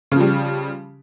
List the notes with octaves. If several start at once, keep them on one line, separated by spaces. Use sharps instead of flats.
C#3 F3 G3